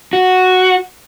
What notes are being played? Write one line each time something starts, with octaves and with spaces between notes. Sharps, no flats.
F#4